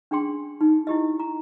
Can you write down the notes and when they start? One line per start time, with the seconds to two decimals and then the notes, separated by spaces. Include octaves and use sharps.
0.11 C#4 D4 G#4 G5 C6
0.61 D#4
0.87 E4 G4 D#5
1.20 A#5